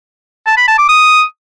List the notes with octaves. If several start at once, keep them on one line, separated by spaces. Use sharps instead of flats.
A5
B5
A5
D6
D#6